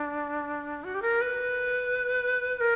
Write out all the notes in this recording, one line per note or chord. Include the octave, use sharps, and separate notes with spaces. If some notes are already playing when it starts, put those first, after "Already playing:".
Already playing: D4
F#4
G4
A#4
B4
B4
A#4